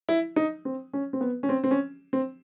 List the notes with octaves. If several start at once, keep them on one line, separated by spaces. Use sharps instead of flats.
E4
D#4
C4
C#4
C4
B3
C#4
C4
C4
C#4
C4